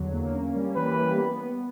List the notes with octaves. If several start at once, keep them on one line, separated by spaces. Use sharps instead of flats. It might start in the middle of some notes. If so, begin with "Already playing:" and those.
Already playing: E2 D3 F#3
A#3
C#4
G3
E3 B4
G4
B3